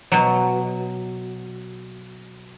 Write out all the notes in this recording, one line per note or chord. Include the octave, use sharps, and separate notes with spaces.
B2 F#3